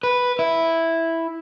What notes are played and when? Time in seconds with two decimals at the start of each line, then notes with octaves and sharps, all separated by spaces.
0.03 B4
0.39 E4